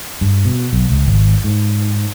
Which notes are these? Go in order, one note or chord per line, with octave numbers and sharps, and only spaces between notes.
G2
B2
B1
C#2
G#1
G#2